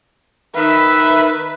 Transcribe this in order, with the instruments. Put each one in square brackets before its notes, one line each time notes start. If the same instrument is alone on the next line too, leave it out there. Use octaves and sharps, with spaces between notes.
[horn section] D#3 E5 [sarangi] B4